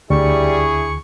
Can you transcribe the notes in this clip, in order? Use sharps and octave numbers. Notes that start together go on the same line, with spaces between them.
D2 G3 D4 E4 G#4 C#6